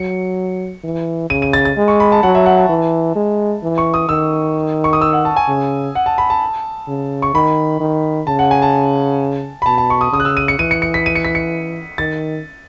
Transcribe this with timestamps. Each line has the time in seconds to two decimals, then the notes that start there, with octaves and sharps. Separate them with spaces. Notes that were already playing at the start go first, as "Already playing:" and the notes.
Already playing: F#3 C#7
0.84 E3
1.30 C#3 D#7
1.42 D#7
1.53 A6
1.65 A6
1.77 G#3
1.88 C#6
2.00 B5
2.12 A5
2.23 F#3 F#5
2.35 E5
2.46 F#5
2.58 A5
2.69 E3
3.16 G#3
3.63 E3
3.78 C#6
3.94 D#6
4.09 D#3 E6
4.84 C#6
4.93 D#6
5.01 E6
5.13 F#5
5.25 A5
5.36 G#5
5.48 C#3
5.95 F#5
6.06 A5
6.18 B5
6.30 A5
6.88 C#3
7.22 C#6
7.34 D#3 B5
7.80 D#3
8.27 C#3 A5
8.39 F#5
8.51 G#5
8.62 A5
9.62 B5
9.66 B2 A5
9.78 A5
9.90 C#6
10.01 D#6
10.12 C#3 D#6
10.20 F#6
10.25 E6
10.37 D#7
10.48 C#7
10.59 E3 D#7
10.71 C#7
10.82 C#7
10.94 B6
11.06 D#7
11.15 C#7
11.25 B6
11.35 C#7
11.98 D#3 A6